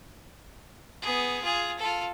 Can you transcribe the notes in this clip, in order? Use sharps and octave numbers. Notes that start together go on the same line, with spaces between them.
B3 G#4
F4 G#4
F4 A4